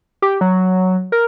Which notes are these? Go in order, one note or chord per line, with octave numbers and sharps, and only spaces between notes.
G4
F#3
A#4